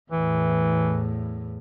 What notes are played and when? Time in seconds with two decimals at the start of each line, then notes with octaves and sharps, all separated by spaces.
0.12 E2 A2 E3